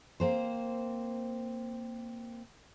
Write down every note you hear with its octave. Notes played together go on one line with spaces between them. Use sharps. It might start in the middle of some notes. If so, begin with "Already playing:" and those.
A#3 C4 C5